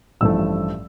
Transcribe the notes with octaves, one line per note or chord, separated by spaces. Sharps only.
A1 G2 F3 A3 E6